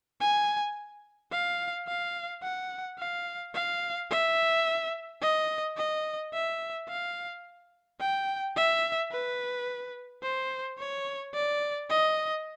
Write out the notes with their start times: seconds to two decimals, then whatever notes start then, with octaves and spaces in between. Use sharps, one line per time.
0.21 G#5
1.32 F5
1.88 F5
2.43 F#5
2.99 F5
3.55 F5
4.11 E5
5.22 D#5
5.78 D#5
6.34 E5
6.89 F5
8.01 G5
8.56 E5
9.12 B4
10.23 C5
10.79 C#5
11.35 D5
11.90 D#5